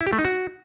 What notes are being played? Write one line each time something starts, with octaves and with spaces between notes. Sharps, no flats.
E4
G4
A3
D#4
F#4